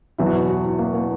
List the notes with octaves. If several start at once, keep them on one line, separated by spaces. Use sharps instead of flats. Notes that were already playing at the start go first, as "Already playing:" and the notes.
E2 B2 F#3 E4
F#4
E4
F#4
E4
A#3
A#3